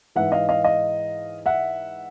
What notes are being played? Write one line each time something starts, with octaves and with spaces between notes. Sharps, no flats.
G#2 E3 E5 F#5
D#5 F5
D#5 F5
D#5 F5
E5 F#5